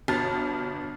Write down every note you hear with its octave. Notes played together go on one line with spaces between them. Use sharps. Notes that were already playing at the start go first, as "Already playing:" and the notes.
G1 B2 A5 F6 A6